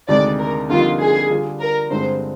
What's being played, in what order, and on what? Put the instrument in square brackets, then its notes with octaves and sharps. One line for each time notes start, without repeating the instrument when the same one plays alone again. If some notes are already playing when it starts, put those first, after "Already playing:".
[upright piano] D2 C3 D#3 G#3 D4 [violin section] D5
[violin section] A#4
[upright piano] F2 D3 G3 A#3 D#4 [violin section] F4
[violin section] G#4
[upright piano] D3 G3 D4 F4
[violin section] A#4
[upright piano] G2 D3 G#3 C4 [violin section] C5